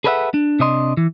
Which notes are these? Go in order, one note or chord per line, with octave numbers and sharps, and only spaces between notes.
G#4 A4 B4 D5 E5 F#5
D4
C3 D4 D#5 C6
E3